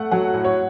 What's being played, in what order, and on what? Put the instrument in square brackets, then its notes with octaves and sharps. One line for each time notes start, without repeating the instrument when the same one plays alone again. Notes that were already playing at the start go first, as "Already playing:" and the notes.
Already playing: [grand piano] A3 [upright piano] F#5
[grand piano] F#3 [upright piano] F#5
[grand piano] A2
[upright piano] C#5